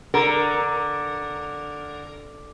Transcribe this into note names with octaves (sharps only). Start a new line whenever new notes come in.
D3 A#4